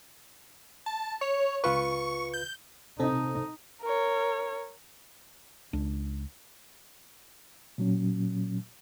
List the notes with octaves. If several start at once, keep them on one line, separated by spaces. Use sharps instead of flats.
A5
C#5
C#2 F4 B4 C#6
G6
C3 C4 D#4 A4
A#4 C#5
C#2 D4
A#2 F#3 C#4